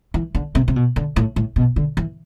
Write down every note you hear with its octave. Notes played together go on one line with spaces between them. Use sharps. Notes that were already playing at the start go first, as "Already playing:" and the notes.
E3
D3
C3
C3
B2
D3
A2
A2
B2
D3
E3